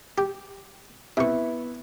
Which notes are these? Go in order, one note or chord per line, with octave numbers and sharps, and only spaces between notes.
G4
C3 B3 E4 C#6